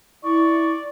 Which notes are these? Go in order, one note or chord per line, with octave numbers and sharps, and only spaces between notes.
E4 D5 C#6